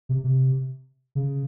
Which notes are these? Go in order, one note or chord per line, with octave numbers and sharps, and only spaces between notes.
C3
C3
C#3